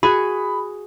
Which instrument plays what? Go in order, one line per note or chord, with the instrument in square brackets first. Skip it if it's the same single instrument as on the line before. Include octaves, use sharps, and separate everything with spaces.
[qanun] F#4 G#4 [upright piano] B5